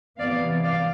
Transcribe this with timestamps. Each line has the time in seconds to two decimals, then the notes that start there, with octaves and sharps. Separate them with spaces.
0.19 C3 E3 B3 D5 F5
0.63 D5 F5